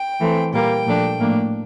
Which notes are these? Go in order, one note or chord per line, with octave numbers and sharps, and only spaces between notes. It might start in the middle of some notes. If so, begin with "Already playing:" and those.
Already playing: G5
E3 A3 C4
A#2 G3 A#3 G5
A#2 F3 A3 D4
A2 F3 A#3 D4